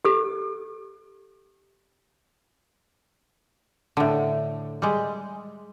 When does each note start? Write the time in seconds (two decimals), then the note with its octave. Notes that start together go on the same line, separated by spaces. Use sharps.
0.05 G4 A4
3.97 A2 D3
4.82 G3 G#3